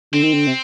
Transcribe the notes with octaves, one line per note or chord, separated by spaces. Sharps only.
D3 C4
D#3
D3
C3